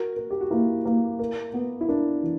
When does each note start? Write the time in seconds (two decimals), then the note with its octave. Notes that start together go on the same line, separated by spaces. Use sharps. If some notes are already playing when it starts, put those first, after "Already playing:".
Already playing: F#4 A#4
0.16 A#4
0.30 G4
0.41 F#4
0.51 A#3 E4
0.85 A#3
1.19 A#4
1.54 B3
1.81 E4
1.88 D4 A#4
2.23 E3